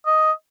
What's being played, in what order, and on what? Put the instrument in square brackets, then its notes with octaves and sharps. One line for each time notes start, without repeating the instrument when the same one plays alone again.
[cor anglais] D#5